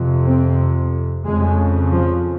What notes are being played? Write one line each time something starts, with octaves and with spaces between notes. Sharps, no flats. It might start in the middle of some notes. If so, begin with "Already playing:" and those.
Already playing: F2 C3
C4
F2 C#3 G#3
F3